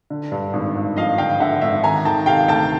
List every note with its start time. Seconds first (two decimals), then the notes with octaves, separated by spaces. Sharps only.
0.10 D3
0.32 G2
0.53 G#1
0.75 G#1
0.96 F3 D#5 F5
1.18 D3 F5 G5
1.40 D3 E5 F#5
1.61 G#1 E5
1.83 D#3 G#5 A#5
2.05 D#3 G5 A5
2.26 C3 F5 G5
2.48 D2 G5 A5